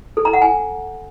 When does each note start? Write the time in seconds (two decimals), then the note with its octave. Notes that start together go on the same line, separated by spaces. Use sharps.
0.17 A4
0.25 A#5
0.33 F#5
0.42 G#5